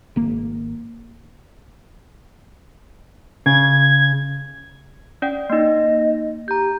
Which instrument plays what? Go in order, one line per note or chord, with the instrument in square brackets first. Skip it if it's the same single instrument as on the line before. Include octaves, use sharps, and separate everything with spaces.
[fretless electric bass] G#1 A#3
[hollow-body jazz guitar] C#3 [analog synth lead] G#6
[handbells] C#4 D5 G5
[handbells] A#3 D#4 [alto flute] D#5
[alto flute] G4 [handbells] A#5 G6